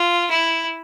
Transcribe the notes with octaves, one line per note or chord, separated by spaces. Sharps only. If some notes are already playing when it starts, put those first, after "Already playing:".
Already playing: F4
E4